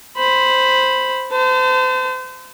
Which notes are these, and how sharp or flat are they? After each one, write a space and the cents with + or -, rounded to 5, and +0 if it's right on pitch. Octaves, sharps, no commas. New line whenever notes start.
C5 +0 B5 +0
C5 -35 A5 +25